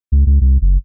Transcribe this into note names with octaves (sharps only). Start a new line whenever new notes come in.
C#2
C#2
C2
F#1